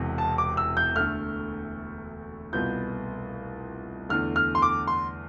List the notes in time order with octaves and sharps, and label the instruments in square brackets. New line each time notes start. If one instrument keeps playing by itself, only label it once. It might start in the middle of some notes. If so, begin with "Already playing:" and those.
Already playing: [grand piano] E1 E2 C3
[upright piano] A5
D6
E6
G6
[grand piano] D2 D3 A3 [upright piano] F6
[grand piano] C2 B2 B3 F4 [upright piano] G6
[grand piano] E2 D3 A3 [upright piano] F6
[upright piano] F6
C6
D6
C6